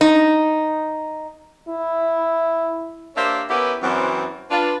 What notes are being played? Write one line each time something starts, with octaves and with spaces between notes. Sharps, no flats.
D#4
E4
A#3 D4 G4 C5 C#5 E5
B3 C#4 E4 G4 A#4 B4
F#2 E3 F#3 C4
D4 F4 B4